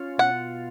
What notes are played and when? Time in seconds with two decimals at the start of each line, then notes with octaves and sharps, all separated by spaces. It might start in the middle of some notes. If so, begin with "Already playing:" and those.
Already playing: C#4 F4
0.18 B2 F#5